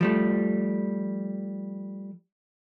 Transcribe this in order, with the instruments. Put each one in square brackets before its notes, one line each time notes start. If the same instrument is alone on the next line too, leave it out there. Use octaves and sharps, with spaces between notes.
[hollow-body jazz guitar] F3 G3 A3